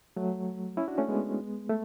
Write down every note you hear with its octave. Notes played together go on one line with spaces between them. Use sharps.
F#3 A3
C#4 E4
D4 F#4
A3 C#4
G#3 B3
A3